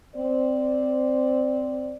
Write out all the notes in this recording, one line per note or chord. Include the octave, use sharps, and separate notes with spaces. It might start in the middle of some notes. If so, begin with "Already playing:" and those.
C4 C5 D5